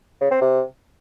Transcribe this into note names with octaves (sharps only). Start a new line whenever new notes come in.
C#3
C4
C3